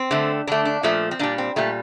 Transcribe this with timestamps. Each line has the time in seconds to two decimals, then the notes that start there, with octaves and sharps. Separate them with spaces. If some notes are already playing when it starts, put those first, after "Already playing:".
Already playing: C4
0.11 D3 A3
0.47 D3 A3 D4
0.65 D4
0.83 A#2 F3 A3
1.11 C4
1.19 A#2 G3 D4
1.38 C4
1.56 A#2 G3 A3